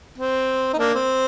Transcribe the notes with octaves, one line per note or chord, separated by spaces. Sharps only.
C4
D#4
A#3 D4
C4